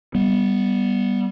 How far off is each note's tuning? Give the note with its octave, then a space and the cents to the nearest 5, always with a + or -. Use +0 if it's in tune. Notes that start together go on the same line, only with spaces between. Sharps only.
G3 +0 B3 -10